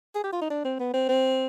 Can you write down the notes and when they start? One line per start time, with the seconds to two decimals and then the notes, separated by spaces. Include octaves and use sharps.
0.15 G#4
0.24 G4
0.33 F4
0.41 D#4
0.50 D4
0.65 C4
0.79 B3
0.94 C4
1.09 C4